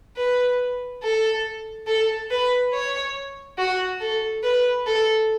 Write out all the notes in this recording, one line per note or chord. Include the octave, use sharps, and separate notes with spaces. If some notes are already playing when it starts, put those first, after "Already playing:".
B4
A4
A4
B4
C#5
F#4
A4
B4
A4